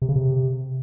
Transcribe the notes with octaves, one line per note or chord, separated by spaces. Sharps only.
C3
C#3
C3